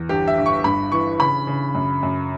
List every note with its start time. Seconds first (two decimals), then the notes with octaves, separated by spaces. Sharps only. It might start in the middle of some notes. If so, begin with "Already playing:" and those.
Already playing: E2
0.09 G1 G4
0.27 E5
0.37 G1
0.46 C#6
0.64 G2 B5
0.92 E3 C#6
1.20 C#3 B5
1.47 C#3
1.75 F#2
2.03 F#2